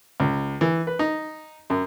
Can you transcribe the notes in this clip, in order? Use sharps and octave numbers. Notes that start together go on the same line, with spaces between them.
C#2
E3
B4
D#4
F#2